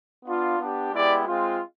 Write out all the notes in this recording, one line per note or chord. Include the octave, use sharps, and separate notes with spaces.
B3 D4 F4
B3 D4 G4
G#3 B3 E4 G4 D5
G#3 C4 F4